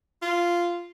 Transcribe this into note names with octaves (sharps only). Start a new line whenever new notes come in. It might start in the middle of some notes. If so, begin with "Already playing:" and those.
F4